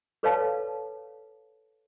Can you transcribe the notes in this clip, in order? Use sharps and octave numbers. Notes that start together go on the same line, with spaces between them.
A4 B4 C#5 D5 F5 A5